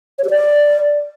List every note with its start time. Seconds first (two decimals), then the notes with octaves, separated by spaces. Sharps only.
0.18 C#5
0.24 G4
0.30 D5